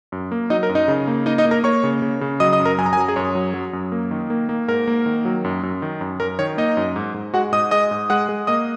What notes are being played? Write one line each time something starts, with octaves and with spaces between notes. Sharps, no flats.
F#2
A#3
F#3 D#4 D#5
A#4
F#2
D#4 D#5
C#3
A#3
A#3 D#4 D#5
D#4 D#5
A#3
A#4 A#5
A#3 C#5 C#6
C#3
C#3
C#3
F#3 D#5 D#6
D#5 D#6
F#2
A#4 A#5
F#2 G#5
A#5
G#5
F#3 A#5
G#4 G#5
F#2 C#5
F#3
F#3
F#2
A#3
D#3
A#3
A#3
G#2 A#4
A#3
D#3
F#3
F#2
F#2
D#3
F#2
F#2 A#4
D#3 C#5
A#3 D#4 D#5
F#2
G#2
G#2
G#3 F#4 F#5
G#2 D#5 D#6
G#3 D#5 D#6
G#2
G#3 F#5 F#6
G#3
A#3 D#5 D#6